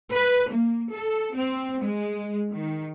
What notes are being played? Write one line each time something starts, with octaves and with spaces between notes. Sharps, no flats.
B4
A#3
A4
C4
G#3
D#3